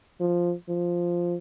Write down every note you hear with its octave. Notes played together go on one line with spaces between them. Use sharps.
F3
F3